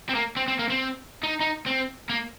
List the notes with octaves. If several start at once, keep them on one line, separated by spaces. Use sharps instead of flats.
C4
A#3
C4
C4
A#3
C4
D#4
D#4
C4
A#3